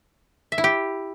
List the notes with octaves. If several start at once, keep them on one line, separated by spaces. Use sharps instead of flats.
E5
E4
G4